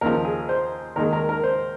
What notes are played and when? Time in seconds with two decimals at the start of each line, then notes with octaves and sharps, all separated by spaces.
0.01 D#2 C#3 F3 A#4
0.25 G#4
0.49 C5
0.96 D#2 D#3 G#3 A#4
1.13 A#4
1.29 A#4
1.44 C5